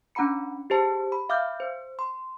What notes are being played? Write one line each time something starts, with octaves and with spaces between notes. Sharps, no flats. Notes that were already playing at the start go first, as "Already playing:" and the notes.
C#4 D4 F#5 A#5 B5 C#7
G4 G#4 C5 A5
B5
E5 F5 D6 D#6 F6 G6
C5
C6